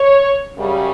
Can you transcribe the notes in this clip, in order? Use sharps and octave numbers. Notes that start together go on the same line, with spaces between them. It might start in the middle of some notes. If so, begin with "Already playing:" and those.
Already playing: C#5
F#2 C#3 G3